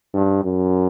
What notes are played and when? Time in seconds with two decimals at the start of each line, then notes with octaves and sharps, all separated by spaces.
0.14 G2
0.44 F#2